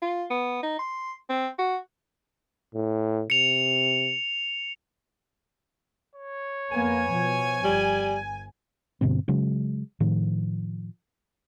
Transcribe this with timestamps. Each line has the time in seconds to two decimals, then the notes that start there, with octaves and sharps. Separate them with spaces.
0.02 F4
0.30 B3
0.63 D#4
0.79 C6
1.30 C4
1.59 F#4
2.75 A2
3.30 C3 C#7 F7
6.15 C#5
6.72 F2 A#3 B3 G#5
7.11 B2 F3
7.64 G1 G3
9.01 G2 B2 D3 C4
9.28 C#3 F#3 G#3
10.00 A2 D#3 F3